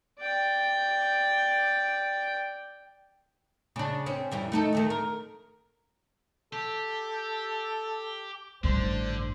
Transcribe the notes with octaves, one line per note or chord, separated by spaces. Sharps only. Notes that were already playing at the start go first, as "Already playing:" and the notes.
D5 G5
C#3 D4
C4 C#4
F#2 E3 G3
A3 D#4 A4
D2 D#3 A3
A#4
G4 A4
A1 G2 D3 C5